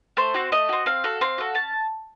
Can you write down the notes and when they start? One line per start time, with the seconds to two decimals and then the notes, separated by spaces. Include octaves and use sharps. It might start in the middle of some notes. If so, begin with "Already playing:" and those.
0.17 A3 C5
0.34 C4 F#4
0.52 A3 D#5
0.69 C4 F#4
0.86 C4 F5
1.04 F#4 A4
1.21 C4 F5
1.38 F#4 A4
1.54 C#4 A5